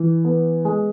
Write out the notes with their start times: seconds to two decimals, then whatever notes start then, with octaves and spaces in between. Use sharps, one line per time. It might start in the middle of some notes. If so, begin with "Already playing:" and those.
Already playing: E3
0.25 B3
0.65 G#3